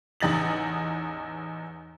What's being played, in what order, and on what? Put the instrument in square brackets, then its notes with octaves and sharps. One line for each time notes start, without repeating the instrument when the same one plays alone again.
[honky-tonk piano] A1 E2 D#4 A6 F#7